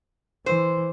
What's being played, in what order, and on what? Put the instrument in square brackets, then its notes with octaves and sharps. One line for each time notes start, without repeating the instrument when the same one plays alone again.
[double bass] E3 [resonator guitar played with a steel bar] C5